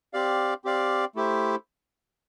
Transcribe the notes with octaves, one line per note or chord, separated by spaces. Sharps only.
C4 G4 D5 F5
C4 G4 D5 F5
A3 E4 G4 C5 E5